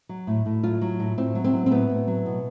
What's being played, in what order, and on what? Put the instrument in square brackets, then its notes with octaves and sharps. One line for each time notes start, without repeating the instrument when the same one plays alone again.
[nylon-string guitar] F#3
A2
A2
F#3 F4
F#3
A2
A2 C4
F#3
C4
F#3
C4
A2 B3
A2
F#3
B2